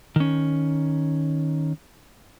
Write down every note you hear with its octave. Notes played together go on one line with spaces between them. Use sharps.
D#3 C#4